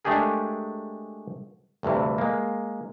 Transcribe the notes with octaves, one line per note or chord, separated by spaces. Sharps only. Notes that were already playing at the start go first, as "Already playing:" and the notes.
G#3 A3 D4 G4 G#4 A#4
D2 G2 C3 E3
G#3 A#3